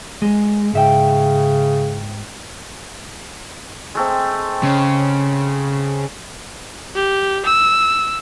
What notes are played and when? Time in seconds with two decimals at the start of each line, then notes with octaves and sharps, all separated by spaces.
0.22 G#3
0.73 G#2 C#3 E5 G5
3.95 G#3 A3 C4
4.63 C#3
6.95 G4
7.45 E6